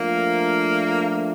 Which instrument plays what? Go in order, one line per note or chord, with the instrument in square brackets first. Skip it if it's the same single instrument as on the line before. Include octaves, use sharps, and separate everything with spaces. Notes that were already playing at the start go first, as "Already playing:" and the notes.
Already playing: [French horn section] F3 A3 D4 F4 [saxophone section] A#3